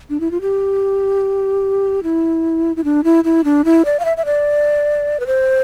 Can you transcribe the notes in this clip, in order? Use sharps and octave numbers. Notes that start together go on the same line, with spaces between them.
D4
E4
F4
G4
E4
E4
D4
E4
E4
D4
E4
D5
F5
E5
E5
D5
B4
C5